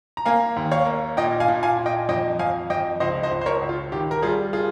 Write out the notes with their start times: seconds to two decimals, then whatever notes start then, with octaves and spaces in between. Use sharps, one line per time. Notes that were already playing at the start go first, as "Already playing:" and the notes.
0.17 A#5
0.26 A#3 F5 G#5
0.56 D#2
0.72 C#5 F5
0.86 A#3
1.17 A#2 D#5 G5
1.40 F5 G#5
1.48 A#2
1.63 F5 G#5
1.78 A#2
1.86 D#5 G5
2.09 F2 D#5 G5
2.39 F2 F5 G#5
2.70 F2 D#5 G5
3.00 C#2 C5 D#5
3.23 C5 D#5
3.31 C#2
3.41 C5
3.46 A#4 C#5
3.61 C#2
3.69 F4
3.92 D#3 G4
4.11 A#4
4.22 G3 F4 G#4
4.53 F4 G#4